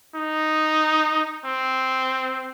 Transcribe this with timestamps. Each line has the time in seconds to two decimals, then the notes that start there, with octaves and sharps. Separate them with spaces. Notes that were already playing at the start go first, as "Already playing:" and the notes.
0.15 D#4
1.46 C4